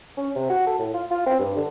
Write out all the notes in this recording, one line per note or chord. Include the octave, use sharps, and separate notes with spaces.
C#4
C3
F#4
A4
A2
F4
F4
C4
G2
D3